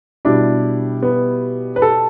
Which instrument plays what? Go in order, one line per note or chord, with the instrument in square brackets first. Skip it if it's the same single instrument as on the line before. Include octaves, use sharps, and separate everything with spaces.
[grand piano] B2 G3 E4 G4 [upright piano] D4
[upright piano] B3
B4
A4